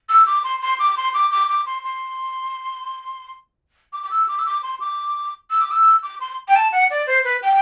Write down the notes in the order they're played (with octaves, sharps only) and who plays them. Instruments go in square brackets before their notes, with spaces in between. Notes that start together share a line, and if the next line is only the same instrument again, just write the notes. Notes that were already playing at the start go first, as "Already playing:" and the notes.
[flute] E6
D6
C6
C6
D6
C6
D6
D6
D6
C6
C6
D6
D6
E6
D6
E6
D6
C6
D6
E6
D6
E6
D6
C6
G5
A5
F#5
D5
C5
B4
G5